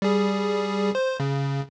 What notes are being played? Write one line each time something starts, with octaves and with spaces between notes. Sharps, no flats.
G3 G#4
C5
C#3